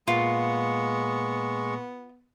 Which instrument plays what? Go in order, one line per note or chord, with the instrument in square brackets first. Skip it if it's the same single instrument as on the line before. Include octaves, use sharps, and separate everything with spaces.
[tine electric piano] A#2 A#3 [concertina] G#3 C#6 [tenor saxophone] B3 [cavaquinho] F4